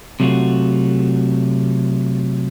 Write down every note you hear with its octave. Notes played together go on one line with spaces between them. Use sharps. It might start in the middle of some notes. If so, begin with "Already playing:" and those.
C3 F#3 A3 B3 F4 F#4